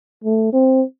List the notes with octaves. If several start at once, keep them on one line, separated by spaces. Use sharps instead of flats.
A3
C4